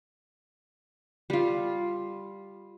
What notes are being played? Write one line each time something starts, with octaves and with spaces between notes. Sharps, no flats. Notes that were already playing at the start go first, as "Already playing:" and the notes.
G3 F4